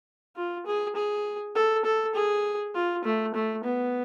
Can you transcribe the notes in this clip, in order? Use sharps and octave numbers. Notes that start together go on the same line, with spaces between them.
F4
G#4
G#4
A4
A4
G#4
F4
A3
A3
B3